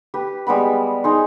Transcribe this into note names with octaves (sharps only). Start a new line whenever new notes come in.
G4 B4
G3 G#3 B3 B5
D#4 G#4 C5